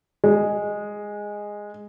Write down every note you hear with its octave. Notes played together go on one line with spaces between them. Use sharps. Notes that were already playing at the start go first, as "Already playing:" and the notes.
G#3